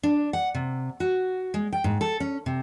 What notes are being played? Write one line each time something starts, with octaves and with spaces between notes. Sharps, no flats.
D4
F#5
C3
F#4
G#3
G5
G#2
A4
C#4
C3